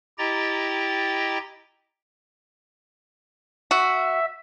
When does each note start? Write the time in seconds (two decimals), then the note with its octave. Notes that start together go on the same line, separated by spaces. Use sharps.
0.18 E4 G4 D#5 G5 A#5 A6
3.71 F#4 E5